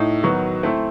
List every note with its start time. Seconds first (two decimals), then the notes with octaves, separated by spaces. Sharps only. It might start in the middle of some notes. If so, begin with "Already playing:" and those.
Already playing: A2 D#4
0.23 D#3 F#3 B3 D#4 F#4
0.63 A3 C4 E4